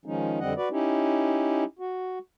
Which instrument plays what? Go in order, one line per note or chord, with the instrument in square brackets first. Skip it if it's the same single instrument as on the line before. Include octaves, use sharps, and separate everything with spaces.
[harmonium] D#3 F3 G#3 C#4 D#4
F2 D3 G3 C4 D#5 F#5
F#4 B4 D5
C#4 D#4 E4 G4
F#4